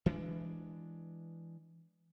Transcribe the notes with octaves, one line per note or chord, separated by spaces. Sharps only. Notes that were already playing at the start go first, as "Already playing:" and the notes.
E3 G#3 D4